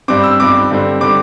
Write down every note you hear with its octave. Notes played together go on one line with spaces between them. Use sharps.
G2 G3 C4 D6
E6
G2 G3 C4 D6
G2 D3 G3 C4
D3 G3 C4 D6